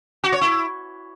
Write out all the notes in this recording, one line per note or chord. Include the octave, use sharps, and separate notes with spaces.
F#4
C#5
E4